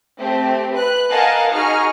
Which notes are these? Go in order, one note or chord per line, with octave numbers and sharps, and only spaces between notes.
A3 C4 G4
B4 F#6
A#4 D#5 F5 F#5 G#5 A5
D#4 F#4 G#4 C#6 F6